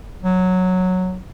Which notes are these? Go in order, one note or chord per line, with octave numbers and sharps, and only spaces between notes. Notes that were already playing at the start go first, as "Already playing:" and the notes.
F#3